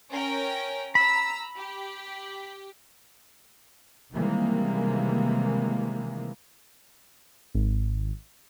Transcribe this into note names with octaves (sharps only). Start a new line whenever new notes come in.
C#4 A#4 G5
A#5 B5 E6
G4
C3 D#3 E3 G3 G#3 A#3
G#1